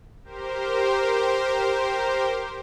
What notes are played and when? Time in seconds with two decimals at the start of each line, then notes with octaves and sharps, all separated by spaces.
0.23 G4 A#4 C5